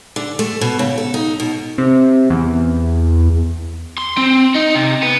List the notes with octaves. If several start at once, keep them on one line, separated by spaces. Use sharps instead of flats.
D3
A3
B2
C#3
A4
D#4
B2
C3
E2
C6
C4
D#4
C3
B3